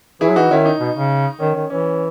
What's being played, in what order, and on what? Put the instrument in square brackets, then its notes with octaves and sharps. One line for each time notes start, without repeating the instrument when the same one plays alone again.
[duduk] E3 [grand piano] E4 G#4
[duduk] F#3
[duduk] E3 [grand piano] D#4 F#4
[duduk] D#3 [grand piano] C#4 E4
[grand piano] D#4
[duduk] B2
C#3
[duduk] D#3 [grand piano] C#4
[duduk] D#3
[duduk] E3 [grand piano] C#4